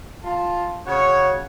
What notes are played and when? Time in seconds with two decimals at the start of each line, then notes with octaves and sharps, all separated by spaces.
0.24 F4 A5
0.87 C#3 F#4 C#5